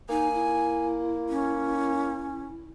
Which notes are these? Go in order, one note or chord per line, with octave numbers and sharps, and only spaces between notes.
A#3 D#4 G#5
E4
C#4